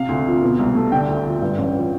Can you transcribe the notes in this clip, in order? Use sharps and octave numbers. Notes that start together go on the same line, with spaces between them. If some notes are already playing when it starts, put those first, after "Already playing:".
Already playing: C3 F5
D2
F3
B2
C2
A3
D3 G5
D2
F3
G2
A1
F3